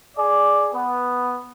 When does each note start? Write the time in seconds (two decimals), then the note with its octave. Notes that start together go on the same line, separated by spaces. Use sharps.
0.17 G#4 D5
0.73 B3